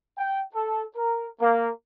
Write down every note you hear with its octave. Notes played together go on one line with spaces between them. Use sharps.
G5
A4
A#4
A#3